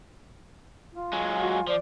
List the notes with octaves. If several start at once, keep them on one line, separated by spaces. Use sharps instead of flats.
F4
F#3 G#3 G#5
F#4
F3 C5 D5